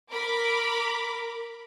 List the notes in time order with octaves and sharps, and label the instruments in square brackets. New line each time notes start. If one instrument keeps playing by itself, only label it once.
[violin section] A#4 B5 D6